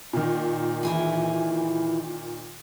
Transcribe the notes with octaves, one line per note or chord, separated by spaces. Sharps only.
A#2 D#3
E3 E4 G#4